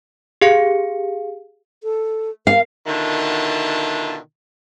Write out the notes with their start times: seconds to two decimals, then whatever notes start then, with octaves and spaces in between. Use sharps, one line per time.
0.42 G4 G#4 F5 C#7
1.83 A4
2.47 A#4 F5
2.87 B2 D3 D#3 E4 F4 A5